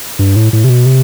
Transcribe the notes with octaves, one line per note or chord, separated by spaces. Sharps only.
G2
A2
A2
C3
B2
C3